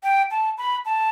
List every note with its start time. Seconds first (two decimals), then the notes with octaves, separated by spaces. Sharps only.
0.03 G5
0.31 A5
0.58 B5
0.85 A5